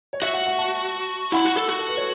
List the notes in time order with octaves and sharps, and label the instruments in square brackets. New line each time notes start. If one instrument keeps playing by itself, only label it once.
[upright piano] C#5
[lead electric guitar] F#4 [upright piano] E5
[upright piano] F#5
F#5
A5
[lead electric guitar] E4 [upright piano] F#5
[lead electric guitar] F#4
A4
F#4
[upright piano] A4
B4
C#5